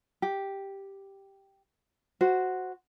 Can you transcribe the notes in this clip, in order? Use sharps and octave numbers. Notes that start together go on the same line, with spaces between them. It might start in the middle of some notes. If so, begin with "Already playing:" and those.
G4
F#4 C5